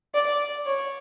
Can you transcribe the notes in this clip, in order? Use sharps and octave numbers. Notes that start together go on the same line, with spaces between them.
D5
C#5